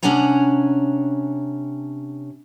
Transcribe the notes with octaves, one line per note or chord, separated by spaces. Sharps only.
C3 C#4 D4 F#5 G#5 A#5